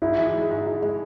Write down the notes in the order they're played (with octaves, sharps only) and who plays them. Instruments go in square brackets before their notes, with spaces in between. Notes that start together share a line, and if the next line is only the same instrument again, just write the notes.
[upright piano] G#2 [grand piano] E4
[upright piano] E3
G#3
G#2
G#2
G#3